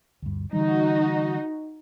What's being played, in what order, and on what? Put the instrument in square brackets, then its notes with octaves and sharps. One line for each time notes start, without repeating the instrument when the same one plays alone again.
[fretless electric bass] D2 G2
[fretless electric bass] D3 E3 G3 [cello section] D#4 F#4